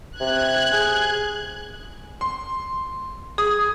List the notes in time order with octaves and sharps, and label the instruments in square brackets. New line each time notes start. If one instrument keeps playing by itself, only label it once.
[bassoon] C3 [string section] F#6 G#6
[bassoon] G#4
[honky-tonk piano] C6
[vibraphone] G#4 [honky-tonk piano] D#6